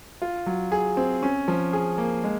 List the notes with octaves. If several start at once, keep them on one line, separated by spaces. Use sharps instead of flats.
F4
F#3
G#4
C4
C#4
F3
G#4
A#3
G#3